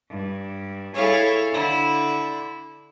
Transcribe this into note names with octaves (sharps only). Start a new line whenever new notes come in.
G2
E4 G#4 A4 C#5 F5
D3 E4